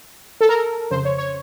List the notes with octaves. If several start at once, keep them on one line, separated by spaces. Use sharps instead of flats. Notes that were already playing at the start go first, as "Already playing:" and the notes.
A4
A#4
F2 C#3 C5
C#5
C#5